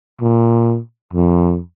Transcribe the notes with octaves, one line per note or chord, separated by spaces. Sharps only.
A#2
F2